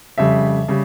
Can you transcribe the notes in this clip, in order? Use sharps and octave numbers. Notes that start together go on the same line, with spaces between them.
F2 C#3 G3 E5
C#3 G3